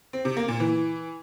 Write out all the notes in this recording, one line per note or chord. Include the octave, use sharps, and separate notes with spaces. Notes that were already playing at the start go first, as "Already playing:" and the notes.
C4
C3
A#3
A#2
E3